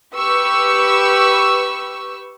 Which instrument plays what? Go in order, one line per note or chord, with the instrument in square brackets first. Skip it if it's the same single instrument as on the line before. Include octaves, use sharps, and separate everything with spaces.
[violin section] G4 B4 C#6 E6